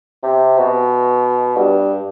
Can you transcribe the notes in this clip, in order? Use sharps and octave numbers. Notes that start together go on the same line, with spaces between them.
C3
B2
G2